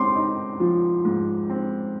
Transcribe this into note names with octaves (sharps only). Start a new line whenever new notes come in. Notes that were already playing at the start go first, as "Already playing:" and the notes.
Already playing: G#2 C4 C6 D6
D#4
F3
G#2
C4